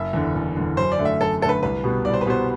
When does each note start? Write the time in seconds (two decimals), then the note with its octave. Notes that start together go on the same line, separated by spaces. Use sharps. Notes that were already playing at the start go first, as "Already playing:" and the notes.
Already playing: F#1 E5
0.13 E2 D3
0.35 F#1
0.56 E2 D3
0.77 F#2 C5
0.92 D5
0.99 D3 A3
1.05 E5
1.20 F#2 A4
1.41 A3 A4
1.45 D3 B4
1.63 C2 B4
1.84 B2 G3 B3
2.05 C2 D5
2.14 C5
2.21 B4
2.26 B2 G3 B3 C5